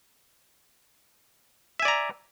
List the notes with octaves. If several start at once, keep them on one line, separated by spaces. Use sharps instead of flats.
D5 E5 G#5 A#5